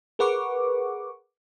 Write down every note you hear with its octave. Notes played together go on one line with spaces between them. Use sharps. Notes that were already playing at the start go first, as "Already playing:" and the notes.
G#4 A#4 B4 F#5 C#6 D6